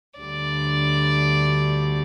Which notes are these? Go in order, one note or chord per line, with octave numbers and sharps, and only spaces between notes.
D2 D3 G3 D5